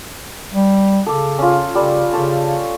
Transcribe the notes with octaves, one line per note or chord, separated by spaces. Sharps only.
G3
C#3 A4 D6
C#4 F4
C#3 G3 A4
C#3 G4 A4 C#5